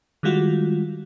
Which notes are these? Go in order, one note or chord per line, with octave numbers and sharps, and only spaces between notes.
D#3 G3 G#3 F4 F#4